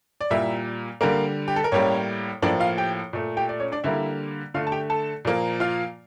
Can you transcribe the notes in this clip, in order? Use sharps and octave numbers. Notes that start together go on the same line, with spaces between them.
D5
A#2 G3 A#3 E4 E5
D3 G3 A#3 A#4
G4
A4
A#4
A2 G3 A#3 C#4 C#5
A2 F3 A#3 D4 D5
F4 F5
G4 G5
A#2 A3
G4 G5
D5
C#4 C#5
D4 D5
D3 G3 A#3 E4 E5
D3 A3 F4 F5
A5
G4 G5
A4 A5
A#2 F3 A#3
F4 F5